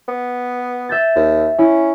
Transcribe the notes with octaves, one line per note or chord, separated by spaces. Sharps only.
B3
E5 G6 A6
D#2
C#4 E4